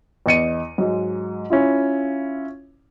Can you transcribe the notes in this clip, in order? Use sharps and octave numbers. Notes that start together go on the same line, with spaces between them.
E2 D#5 C#7 D#7
G#2 F#3 G#3
C#4 E4 F4